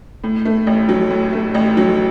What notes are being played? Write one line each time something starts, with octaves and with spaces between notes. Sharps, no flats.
A2
A3
A1
F#3
A2
A3
A1
F#3